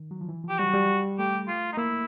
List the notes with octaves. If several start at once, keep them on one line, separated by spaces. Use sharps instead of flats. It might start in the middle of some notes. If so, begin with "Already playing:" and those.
Already playing: D#3
F#3
F3
E3
F3
G4
G3 F#4
F#3
G3
A3 G4
F4
D#4
A#3 E4